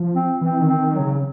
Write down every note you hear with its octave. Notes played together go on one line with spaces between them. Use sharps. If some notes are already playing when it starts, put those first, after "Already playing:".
Already playing: F3
C4
E3 C4
D#3
C4
D#3
F#3
C#3